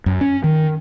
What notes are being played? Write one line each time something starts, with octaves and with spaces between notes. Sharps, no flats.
F#2
C#4
D#3